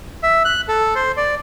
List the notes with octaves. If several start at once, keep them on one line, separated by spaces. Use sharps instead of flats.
E5
F#6
A4
C5
D5